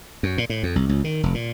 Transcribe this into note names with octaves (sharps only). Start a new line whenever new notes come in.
F#2
A#2
A2
F2
C2
C#2
D#3
F1
A#2